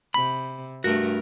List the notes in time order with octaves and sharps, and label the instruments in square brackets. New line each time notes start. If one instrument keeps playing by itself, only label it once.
[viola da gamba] C3 [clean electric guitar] B5
[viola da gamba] G2 A3 A#4 [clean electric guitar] F#4